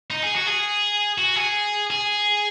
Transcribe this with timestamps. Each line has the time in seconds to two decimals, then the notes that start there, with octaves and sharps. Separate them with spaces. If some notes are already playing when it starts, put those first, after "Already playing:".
0.10 D#4
0.23 G#4
0.35 F#4
0.46 G#4
1.18 F#4
1.36 G#4
1.90 G#4